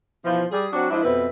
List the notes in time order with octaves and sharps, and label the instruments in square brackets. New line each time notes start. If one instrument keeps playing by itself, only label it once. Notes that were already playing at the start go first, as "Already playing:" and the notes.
[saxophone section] B2 E3 F3
G3 G#4
F#3 C4 D4 F#4
F3 G#3 D4 E4
F2 B2 C4 B4 E5